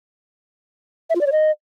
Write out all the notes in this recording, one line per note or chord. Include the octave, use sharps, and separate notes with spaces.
E5
F4
D5
C#5
D#5